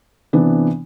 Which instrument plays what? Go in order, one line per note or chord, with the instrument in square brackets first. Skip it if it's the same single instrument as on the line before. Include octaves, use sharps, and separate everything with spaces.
[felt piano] C3 E3 B3 D4